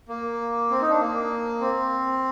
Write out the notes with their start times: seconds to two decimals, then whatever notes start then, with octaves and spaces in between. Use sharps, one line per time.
0.09 A#3
0.71 C4
0.81 D#4
0.90 D4
1.01 A#3
1.60 C4